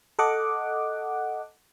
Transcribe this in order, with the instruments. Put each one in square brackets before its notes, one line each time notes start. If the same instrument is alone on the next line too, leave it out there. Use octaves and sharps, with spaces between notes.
[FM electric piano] A4 D#5 F#5 D6